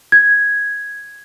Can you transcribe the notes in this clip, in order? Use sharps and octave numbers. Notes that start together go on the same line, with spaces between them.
G#6